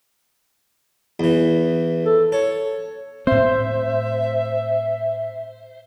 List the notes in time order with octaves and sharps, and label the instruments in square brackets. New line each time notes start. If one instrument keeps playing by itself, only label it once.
[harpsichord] E2 E3
[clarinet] A4
[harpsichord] A4 [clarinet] C#5
[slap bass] A2 C4 [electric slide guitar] C5 [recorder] E5